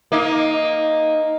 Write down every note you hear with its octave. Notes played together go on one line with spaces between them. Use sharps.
A#3 D#4